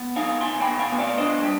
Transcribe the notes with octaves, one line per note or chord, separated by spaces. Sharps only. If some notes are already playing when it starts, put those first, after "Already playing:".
Already playing: B3
D#4 F5 G#5
B2 G#5 C6
G5 B5
B2
F5 G#5
B3
D5 F5
D4 C5 D#5
G3 G4